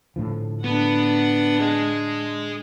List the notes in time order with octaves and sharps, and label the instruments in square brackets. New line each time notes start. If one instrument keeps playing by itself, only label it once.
[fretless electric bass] A2 D3 F3
[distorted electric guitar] B3 [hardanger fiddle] D4 F#5
[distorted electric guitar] G#4 D#5